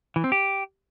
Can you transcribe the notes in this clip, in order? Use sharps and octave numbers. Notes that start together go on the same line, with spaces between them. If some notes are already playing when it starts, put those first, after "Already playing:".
E3
C4
G4